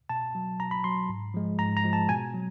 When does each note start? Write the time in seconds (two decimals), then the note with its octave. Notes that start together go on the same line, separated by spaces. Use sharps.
0.09 B2 A5
0.35 F#3
0.60 B2 A#5
0.71 B5
0.84 F#3 C6
1.09 G#2
1.34 F3 G#3
1.59 G#2 A#5
1.77 A#5
1.84 F3 G#3
1.93 A5
2.09 B2 G#5
2.34 F#3